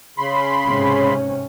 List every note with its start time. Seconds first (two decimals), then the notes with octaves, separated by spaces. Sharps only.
0.18 C#3 B5 C6
0.65 G#2 C3 C#4